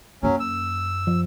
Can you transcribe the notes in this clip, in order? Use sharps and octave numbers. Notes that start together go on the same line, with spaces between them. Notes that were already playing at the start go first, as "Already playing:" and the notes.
F#2 F#3 A#3 C#4
E6
F3